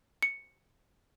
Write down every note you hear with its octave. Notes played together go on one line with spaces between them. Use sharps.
C#7